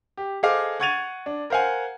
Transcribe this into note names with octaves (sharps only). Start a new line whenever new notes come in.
G4
G#4 A4 C5 D#5 F5 D6
F#5 C#6 G#6 A6 D#7 F7
D4
A#4 C5 F5 F#5 G#5